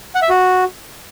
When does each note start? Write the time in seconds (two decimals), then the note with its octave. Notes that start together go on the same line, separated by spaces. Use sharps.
0.15 F#5
0.22 E5
0.29 F#4